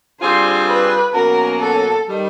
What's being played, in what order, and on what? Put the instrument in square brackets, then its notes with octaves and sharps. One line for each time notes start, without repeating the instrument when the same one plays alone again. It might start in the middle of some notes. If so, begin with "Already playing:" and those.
[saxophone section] D3 G3 C4 F4 G#4 [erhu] C5
[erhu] B4
[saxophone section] B2 F#3 A#3 C#4 F#4 [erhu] A#4
[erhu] A4
[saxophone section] D#3 G3